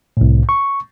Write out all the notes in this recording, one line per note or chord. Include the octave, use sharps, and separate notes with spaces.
C2 A2
C#6